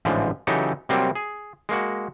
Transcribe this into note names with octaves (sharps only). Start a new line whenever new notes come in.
A1 G#2 D3 E3 F3
C#3 E3 F#3 D#4 G4 A4
C3 F#3 G3 A#3 C4
G#4
G#3 A#3 F#4